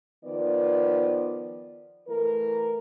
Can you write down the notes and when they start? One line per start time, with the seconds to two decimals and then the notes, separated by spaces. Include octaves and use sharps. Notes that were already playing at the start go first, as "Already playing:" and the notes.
0.25 D#3 F3 B3 D5
2.09 E3 A3 A#4